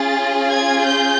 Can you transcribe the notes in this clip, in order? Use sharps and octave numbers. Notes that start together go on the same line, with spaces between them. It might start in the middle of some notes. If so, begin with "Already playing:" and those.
Already playing: C#4 F4 G#4 A6
G#6
G6